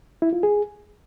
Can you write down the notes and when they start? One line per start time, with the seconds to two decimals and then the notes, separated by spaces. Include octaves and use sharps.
0.22 E4
0.33 F4
0.43 G#4